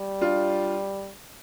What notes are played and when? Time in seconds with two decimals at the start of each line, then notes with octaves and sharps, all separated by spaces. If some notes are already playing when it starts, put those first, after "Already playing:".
Already playing: G3
0.21 D4 F4